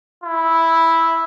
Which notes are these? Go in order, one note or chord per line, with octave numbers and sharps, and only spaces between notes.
E4